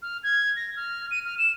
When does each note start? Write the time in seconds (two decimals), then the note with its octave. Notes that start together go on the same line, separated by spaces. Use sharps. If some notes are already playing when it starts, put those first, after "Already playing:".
0.02 F6
0.23 G#6
0.56 A#6
0.76 F6
1.11 D#7
1.25 F6
1.38 E7